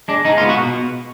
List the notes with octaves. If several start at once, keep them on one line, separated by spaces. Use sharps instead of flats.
G#3 D4
G#3 D#4
F4
B3
F#4
B2